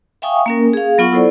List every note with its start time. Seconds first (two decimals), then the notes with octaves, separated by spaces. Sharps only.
0.22 E5 F5 G5 G#5 C#6 D#6
0.46 A#3 C#4 A#4
0.73 G#4 F5
0.98 F#3 B3 F4 F#5 C#6
1.13 E4 A4 C5 D5